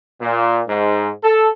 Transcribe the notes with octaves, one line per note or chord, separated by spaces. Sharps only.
A#2
G#2
A4